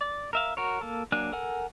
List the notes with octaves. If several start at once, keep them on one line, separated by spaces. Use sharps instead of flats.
D5
A#4 E5 F5
F#4 A#4 C#5
A#3 A4
F#3 A#3 D4 G#5 F#6
A4 A#4 F#5 G#5